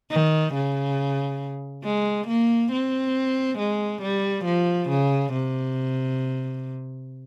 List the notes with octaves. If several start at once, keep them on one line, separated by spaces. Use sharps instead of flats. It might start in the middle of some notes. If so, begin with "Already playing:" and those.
D#3
C#3
G#3
A#3
C4
G#3
G3
F3
C#3
C3